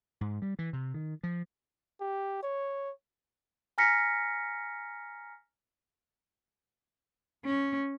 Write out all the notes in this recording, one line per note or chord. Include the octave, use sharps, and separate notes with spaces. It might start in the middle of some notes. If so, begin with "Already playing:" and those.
G#2
G3
E3
C3
D#3
F3
G4
C#5
G#5 A#5 F6 A#6 B6 C#7
C#4